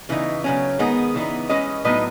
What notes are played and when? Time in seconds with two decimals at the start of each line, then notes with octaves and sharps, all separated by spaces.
0.09 C#3 E3 D#4
0.44 C#3 F#3 C#4
0.79 D#3 G#3 B3 D#4
1.14 C#3 E3 B3 D#4
1.49 E3 G#3 C#4 B4 D#5
1.85 A2 F#3 B3 D#4 B4 D#5